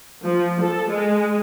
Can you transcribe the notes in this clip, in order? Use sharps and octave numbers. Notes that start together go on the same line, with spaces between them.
F3
A4
G#3